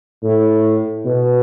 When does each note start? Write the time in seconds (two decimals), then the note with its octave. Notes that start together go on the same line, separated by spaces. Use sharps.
0.23 A2
1.05 B2